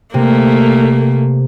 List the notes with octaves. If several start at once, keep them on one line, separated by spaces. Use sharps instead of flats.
C3 A3 A#3